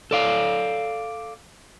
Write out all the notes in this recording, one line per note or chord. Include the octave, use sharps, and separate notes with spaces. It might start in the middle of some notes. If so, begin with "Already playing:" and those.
A4 D5 F5